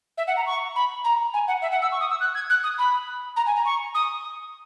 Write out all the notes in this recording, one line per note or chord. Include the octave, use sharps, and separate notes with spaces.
E5
F#5
A#5
C#6
B5
A#5
G#5
F#5
E5
F#5
E6
C#6
D#6
E6
F#6
G#6
F#6
D#6
B5
A#5
G#5
A#5
C#6
D#6